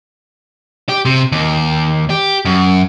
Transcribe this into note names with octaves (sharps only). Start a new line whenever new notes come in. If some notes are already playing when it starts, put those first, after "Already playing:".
G4
C3
D#2
G4
F#2